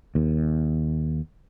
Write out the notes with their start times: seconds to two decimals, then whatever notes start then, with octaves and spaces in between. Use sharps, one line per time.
0.15 D#2